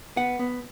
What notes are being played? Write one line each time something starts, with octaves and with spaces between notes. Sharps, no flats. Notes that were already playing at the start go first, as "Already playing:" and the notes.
B3 F#5
B3